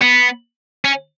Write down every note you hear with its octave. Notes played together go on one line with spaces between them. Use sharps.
B3
C#4